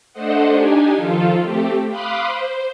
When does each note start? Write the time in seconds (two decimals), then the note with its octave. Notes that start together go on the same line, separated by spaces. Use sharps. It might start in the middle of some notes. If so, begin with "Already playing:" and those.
0.13 A3 D4 A4 C5 D#5 F#5
0.50 D4 D#4 G4 G#5
0.95 D#3 F3 F4 A4
1.40 A3 C4 G4
1.89 F5 B5 C6 D6 D#6 F#6
2.26 C5